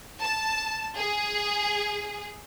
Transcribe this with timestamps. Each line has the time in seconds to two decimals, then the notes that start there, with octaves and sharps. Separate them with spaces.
0.21 A5
0.97 G#4